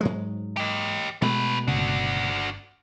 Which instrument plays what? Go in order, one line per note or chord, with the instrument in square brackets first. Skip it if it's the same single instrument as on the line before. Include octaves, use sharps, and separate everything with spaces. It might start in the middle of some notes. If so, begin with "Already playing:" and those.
[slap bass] G#2 F#3 G#3
[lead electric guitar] G4 D#5
[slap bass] B2 G#3 A3 [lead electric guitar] A4 B4
[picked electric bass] G1 C#3 [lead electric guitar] D4 F#4